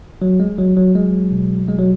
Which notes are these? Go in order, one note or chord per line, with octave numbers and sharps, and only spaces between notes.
F#3
G#3
F#3
F#3
F#3 G#3
B2
F#3 G#3
F#3